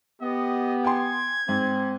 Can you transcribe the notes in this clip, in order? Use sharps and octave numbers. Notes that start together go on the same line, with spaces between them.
B3 G4 D#5
G5 G#5 C6 G#6
G#2 C4